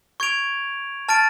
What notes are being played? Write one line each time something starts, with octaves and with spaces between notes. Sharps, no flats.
C#6 G#6 D7 F7
A5 F6 A6 D7